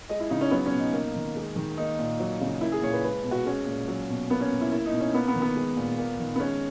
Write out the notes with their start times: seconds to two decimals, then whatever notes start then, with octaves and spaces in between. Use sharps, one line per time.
0.09 G#3 D#5
0.20 E4
0.30 C#3 D#4
0.41 C#4
0.51 F#3 B3
0.66 C#4
0.73 B2
0.79 D#4
0.93 A#3
1.15 D#3
1.36 G#3
1.56 D#3
1.77 A#3 D#4
1.99 A#2
2.20 F#3
2.41 C#3
2.61 A#3 E4
2.72 G#4
2.82 A#2 C#5
2.93 B4
3.04 G#3 B4
3.24 B2
3.31 F#4
3.45 G#3 C#4
3.66 A#2
3.88 F#3
4.09 B2
4.30 A#3 B3
4.40 C#4
4.51 B2
4.61 E4
4.72 A#3 E4
4.86 D#4
4.92 B2
5.00 C#4
5.14 A#3 B3
5.28 B3
5.35 D#3
5.42 B3
5.56 G#3
5.77 A#2
5.98 A#3
6.19 D#3
6.36 B3
6.40 G#3 C#4